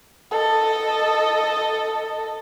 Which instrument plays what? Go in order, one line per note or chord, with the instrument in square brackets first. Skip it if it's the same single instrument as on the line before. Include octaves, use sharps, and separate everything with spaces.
[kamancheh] A4 D#5